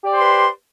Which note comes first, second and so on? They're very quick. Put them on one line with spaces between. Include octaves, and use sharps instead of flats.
G4 D5 C5 C6 B4